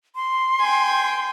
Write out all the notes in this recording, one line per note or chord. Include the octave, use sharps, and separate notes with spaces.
C6
G5 G#5